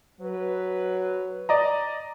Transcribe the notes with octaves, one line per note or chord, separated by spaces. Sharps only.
F#3 B4
D5 D#5 A#5